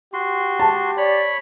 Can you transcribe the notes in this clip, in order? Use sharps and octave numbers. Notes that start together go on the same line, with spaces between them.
F#4 G4 C6
A5
C#5 D5 B5